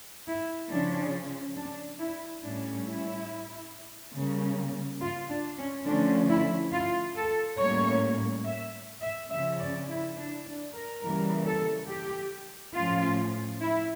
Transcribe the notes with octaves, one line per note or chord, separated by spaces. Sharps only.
E4
C#3 F3 C#4 D4
D4
E4
A2 G3 C#4 D4
E4
C#3 G3 A#3 C#4
F4
D4
C#4
D3 F3 A3 C#4 D4
E4
F4
A4
A2 G3 A#3 C#4 C#5
E5
E5
C#3 F3 C#4 E5
D5
E4
D4
D4
A#4
C#3 E3 G3 A#3 A#4
A4
G4
A2 F3 C#4 F4
E4